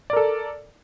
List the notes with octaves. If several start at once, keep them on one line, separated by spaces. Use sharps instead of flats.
A4 A#4 D5